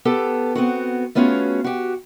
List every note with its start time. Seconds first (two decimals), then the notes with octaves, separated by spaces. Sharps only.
0.05 B3 G4 A4 A5
0.55 B3 C4 F#4
1.15 A3 B3 C#4 F4 F#4 G#4
1.64 F#4 G4